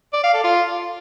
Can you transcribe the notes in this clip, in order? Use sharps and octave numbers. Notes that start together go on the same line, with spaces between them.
D5
F5
A4
F4